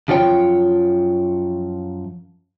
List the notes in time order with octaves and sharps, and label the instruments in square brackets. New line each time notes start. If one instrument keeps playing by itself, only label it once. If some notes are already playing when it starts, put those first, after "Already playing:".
[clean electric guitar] F#2 F3 F4 C#5 G5